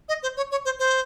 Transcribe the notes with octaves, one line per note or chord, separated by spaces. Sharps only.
D#5
C5
C#5
C#5
C5
C5